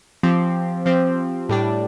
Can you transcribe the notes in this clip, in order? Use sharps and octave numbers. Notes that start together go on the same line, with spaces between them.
F3 C4 G4
F3 C4 G4
A2 G3 D4